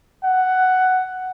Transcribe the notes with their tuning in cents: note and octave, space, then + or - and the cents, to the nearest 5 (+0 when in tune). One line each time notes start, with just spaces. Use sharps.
F#5 +5